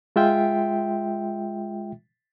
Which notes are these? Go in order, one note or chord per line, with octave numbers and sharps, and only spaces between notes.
G#3 F4 E5 G5